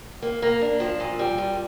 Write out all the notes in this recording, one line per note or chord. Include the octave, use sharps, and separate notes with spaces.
A#3
A#3
D4
F3
A#2
G3
A#2